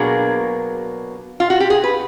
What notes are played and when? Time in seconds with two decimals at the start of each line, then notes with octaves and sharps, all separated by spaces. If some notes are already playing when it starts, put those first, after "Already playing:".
Already playing: B2 F#3 A#3 D4 G#4
1.40 F4
1.50 F#4
1.60 G4
1.70 G#4
1.84 B4